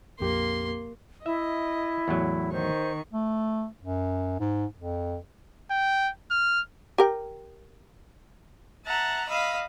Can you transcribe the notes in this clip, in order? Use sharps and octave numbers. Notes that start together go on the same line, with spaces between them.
A#1 F2 A#3 G4 C6
E4 D#5 E5
E2 A2 F#3
D#3 C5 C#6
A3
F#2
G#2
F2
G5
F6
G4 A#4 G5
E5 F#5 A5 A#5
D#5 F5 B5 E6